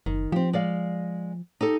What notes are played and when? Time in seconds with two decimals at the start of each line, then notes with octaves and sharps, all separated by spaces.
0.06 F#1 D#3
0.32 F3 C4 G4
0.53 G#3 D5 F5
1.61 D#4 G4 A4